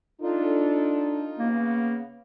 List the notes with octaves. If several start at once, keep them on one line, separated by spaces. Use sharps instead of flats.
D4 D#4 F4 A4
C#3 A#3 B3